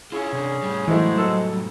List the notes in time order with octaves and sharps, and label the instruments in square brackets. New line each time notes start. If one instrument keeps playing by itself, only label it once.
[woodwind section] C#4 G#4 [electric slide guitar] E4 F4
[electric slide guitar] C3 D4
A2 G3
[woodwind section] G#2 G#3 [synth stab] E3 [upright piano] F#3 A3 E4
[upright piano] F#3 A4 [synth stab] E6